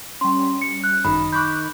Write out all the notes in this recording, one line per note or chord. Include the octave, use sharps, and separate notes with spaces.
G3 C#4 C6
C#7
F#6
G#1 F#2 D#3 B5
B5 C#6 D6 F#6 G6